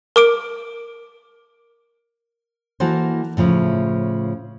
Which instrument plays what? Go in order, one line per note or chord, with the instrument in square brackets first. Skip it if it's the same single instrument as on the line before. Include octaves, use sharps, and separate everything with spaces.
[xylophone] A#4 D6 D7
[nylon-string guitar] E3 A#3 F#4 A4 C5
A2 C#3 F3 A3